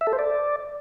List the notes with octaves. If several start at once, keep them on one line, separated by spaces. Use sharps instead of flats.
E5
A4
C5
D5